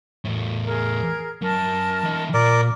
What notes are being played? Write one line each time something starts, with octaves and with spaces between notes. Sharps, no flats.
E2 A2
G#4 A#4
F#2 A#4 A5
E3 D#5
A#2 A#4 D5